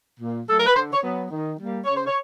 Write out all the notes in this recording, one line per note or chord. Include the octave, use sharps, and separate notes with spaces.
A#2
F#3 A3 A4
A#4
B4
D3 C5
C#5
F#3 B3
D#3
G3 A#3
C#3 C#5
C5
C#5